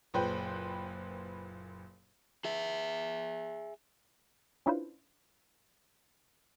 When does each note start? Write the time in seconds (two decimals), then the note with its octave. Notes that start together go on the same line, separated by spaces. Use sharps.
0.14 F#1 A#2 B4 C5 G5
2.45 G#4 E5
4.66 C#4 D4 E4 F4 B4 C5